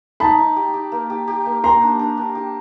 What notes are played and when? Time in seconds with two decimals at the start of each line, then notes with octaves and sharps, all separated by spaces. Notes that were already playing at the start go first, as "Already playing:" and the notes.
0.20 D#4 A5 B5
0.38 D#4
0.56 G4
0.74 G4
0.92 A#3
1.10 G4
1.28 G4
1.46 A#3
1.64 A#3 A#5 C6
1.81 D4
1.99 D4
2.17 D4
2.35 G4